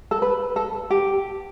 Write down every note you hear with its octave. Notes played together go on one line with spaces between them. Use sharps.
A4
B4
A4
G4